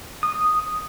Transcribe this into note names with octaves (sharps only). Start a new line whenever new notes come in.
D#6